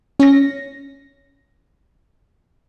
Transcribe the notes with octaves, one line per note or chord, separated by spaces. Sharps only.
C#4 A#6